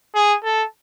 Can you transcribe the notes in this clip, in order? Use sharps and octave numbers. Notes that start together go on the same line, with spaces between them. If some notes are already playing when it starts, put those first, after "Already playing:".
G#4
A4